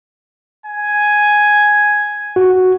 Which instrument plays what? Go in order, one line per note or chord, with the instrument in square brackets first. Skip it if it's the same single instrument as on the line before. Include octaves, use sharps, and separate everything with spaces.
[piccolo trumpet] G#5
[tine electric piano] F#4